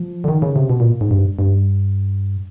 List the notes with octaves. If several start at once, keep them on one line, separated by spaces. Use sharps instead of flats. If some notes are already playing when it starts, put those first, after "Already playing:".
Already playing: F3
D3
D#3
C#3
C3
B2
A#2
G#2
G2
G2